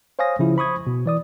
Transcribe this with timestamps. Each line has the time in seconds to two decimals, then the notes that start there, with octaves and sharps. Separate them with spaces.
0.19 C5 C#5 F5 G#5 D#6 A#6
0.39 C#3 F3 E4
0.57 C5 B5 C#6 D#6 G#6
0.87 B2
1.06 E3 D5 D#6